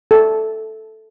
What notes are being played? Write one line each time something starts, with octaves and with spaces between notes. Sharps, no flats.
A4